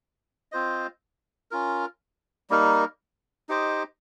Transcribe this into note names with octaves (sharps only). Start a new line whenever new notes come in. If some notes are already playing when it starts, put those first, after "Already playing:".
C4 F4 C5 D#5
C#4 F4 A#4
G3 A#3 D#4 A#4
D#4 G4 C5 D#5